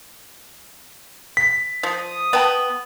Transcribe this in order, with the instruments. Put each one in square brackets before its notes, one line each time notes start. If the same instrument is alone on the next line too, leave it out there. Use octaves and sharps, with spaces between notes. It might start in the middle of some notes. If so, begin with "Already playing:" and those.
[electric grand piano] B6
[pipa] F3 [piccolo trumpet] D#6
[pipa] B3 G5 A5